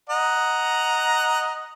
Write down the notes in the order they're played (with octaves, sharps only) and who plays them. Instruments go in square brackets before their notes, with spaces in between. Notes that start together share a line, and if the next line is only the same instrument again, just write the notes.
[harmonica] D#5 F#5 A#5